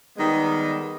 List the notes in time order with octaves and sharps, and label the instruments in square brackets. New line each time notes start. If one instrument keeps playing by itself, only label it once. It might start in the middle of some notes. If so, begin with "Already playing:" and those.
[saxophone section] D#3 G3 G#3 B3